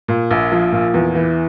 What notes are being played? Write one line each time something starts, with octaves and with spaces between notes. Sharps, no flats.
A#2
A#1
F3
A#2
E2
E3